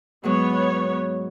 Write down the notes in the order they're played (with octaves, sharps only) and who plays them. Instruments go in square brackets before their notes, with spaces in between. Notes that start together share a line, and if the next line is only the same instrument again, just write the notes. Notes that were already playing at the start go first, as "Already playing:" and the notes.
[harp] G#2 F#3 G#3 [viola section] B3 C#5